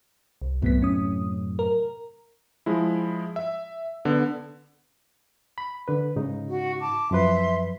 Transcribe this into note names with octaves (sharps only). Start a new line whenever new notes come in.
C2
C2 F#2 A2 C3 B3 B6
C#4 D#6
A#4
F3 G#3 E4
E5
D3 B3
B5
D3 B4
G#2 C#3 D#4
F#4
A5 D6
F#2 F3 B4 E5 C6